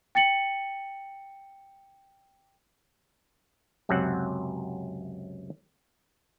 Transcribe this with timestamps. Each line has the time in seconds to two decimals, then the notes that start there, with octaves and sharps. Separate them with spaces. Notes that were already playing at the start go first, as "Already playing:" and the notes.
0.15 G5 A6 C#7 F#7
3.89 C#2 F#2 C3 F#3 C4 F#5